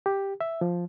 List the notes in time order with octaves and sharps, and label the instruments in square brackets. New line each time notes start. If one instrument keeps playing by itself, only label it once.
[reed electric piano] G4
E5
F3